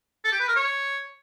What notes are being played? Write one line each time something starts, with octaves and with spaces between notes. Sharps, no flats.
A4
G4
B4
A#4
C#5